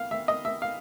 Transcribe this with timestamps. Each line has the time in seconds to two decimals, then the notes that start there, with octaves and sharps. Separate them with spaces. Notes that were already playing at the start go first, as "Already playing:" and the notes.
Already playing: F5
0.11 E5
0.28 D#5
0.45 E5
0.62 F5